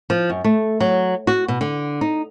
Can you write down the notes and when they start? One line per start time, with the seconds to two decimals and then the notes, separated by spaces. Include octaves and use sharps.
0.10 F3
0.30 F#2
0.44 A3
0.80 F#3
1.27 F#4
1.48 B2
1.61 D3
2.01 D#4